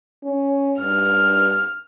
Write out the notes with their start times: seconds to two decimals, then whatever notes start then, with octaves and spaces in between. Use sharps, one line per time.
0.24 C#4
0.80 G2 F6